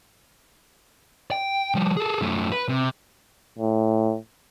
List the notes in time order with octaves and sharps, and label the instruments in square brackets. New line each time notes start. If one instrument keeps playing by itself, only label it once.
[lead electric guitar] G5
F3 G3
G#4 A4
F#2 A3
B4
C3
[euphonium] A2